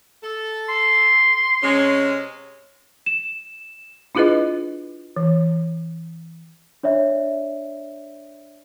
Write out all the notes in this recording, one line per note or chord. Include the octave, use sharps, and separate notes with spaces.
A4
C6
C3 G#3 C#4
E7
D4 E4 F4 G#4 B4 D#5
E3
D4 C#5 D5 E5